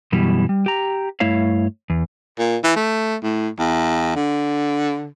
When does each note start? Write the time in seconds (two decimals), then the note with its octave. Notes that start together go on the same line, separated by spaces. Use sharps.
0.12 F#2 B2 E3 G3
0.49 G3
0.66 G4 A#5
1.20 G2 A3 E4 C#5 F5
1.90 E2
2.39 A#2
2.64 E3
2.76 A3
3.23 A2
3.59 E2
4.15 D3